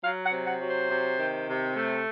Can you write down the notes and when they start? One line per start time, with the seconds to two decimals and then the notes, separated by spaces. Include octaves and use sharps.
0.03 F#3 F5
0.24 F#5
0.31 C3
0.46 F#5
0.60 F#3
0.67 C5
0.90 C3
1.19 D#3
1.47 C3
1.76 A3